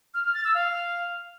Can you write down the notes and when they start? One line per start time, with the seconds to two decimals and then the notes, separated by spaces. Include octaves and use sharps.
0.14 F6
0.24 F6
0.34 A6
0.44 E6
0.55 F5